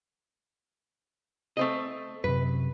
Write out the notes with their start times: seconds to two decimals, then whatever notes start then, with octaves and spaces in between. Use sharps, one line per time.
1.57 A3 C4 D#5
2.24 F#2 C3 B4